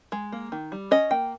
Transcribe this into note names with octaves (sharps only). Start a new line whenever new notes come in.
G#3
A#3
D#3
G3
C#4 D#5
A#3 G5